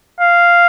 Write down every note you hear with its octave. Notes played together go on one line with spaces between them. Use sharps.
F5